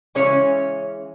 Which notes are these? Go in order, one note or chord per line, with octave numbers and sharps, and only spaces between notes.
C#3 E3 G#3 C#4 C#5